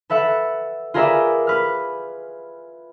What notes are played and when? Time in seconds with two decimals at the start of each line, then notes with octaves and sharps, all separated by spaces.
0.10 A4 B4 E5 F#5
0.94 F4 G#4 A#4 B4 D5 E5
1.47 B4 F6